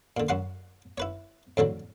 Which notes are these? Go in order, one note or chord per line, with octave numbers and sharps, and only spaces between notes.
A#2 D3
F#2 F#4 F#5 C6
E4 B4 C#5
F2 A2 D3 F#3